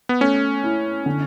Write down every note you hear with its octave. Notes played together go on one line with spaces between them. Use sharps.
B3
A3 C#4
E4
D3